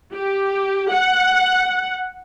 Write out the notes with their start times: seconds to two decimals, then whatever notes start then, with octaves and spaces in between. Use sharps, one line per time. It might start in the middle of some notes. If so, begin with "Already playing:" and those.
0.14 G4
0.91 F#5